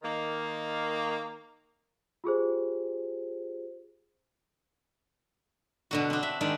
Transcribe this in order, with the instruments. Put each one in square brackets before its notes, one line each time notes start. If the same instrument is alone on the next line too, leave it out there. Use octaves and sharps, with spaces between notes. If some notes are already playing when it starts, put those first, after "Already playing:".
[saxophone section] D#3 A#3
[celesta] F4 G4 G#4 C5
[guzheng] B2 D3 F#4
C4 D4
E5
D#3 G#3 D4 D5